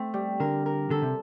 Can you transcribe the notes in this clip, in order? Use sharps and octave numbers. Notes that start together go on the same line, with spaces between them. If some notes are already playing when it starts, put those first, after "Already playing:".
Already playing: A3 C4
G3
D3 A#4
A#4
D3 A4
C3